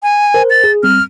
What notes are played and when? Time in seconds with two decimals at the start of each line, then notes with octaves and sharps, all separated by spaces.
0.03 G#5
0.34 A#4 C5
0.50 A6
0.64 G#4
0.83 G3 C4 F6